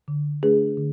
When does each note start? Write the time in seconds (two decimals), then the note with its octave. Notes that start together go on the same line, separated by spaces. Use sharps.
0.08 D3
0.43 A3 D4 G#4 B4
0.78 D3